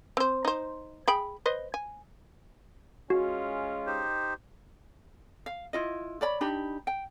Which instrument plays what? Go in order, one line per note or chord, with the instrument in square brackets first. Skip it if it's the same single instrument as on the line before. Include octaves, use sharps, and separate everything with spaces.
[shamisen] C4 C5
D#4 C5
G#4 G5 B5
B4 C5 D#5
G#5
[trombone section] G#3 C#4 F4 [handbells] F#4
[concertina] D#4 G4 C5
[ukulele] F5
E4 F4 D#5
C#5 D5 B5
D4 D#4 G4 B5
G5